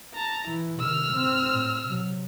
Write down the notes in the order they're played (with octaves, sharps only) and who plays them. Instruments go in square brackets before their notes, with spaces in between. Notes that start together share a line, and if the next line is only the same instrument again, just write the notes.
[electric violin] A5 A#5
[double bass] E3 [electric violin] E4
[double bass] C3 D#3 [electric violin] E6 F6
[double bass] C4
A2
C3 F#3